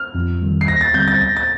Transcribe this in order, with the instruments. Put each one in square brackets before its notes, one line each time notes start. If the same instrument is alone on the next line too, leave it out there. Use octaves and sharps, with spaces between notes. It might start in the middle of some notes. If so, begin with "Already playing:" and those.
Already playing: [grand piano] F6
[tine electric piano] F2
D#3 G3
[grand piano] C7
[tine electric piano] D#2 [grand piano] A#6
[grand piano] A6
[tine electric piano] D3 G3 C4 [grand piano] G6
[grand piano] A6
[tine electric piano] D2 [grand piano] A#6
[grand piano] A6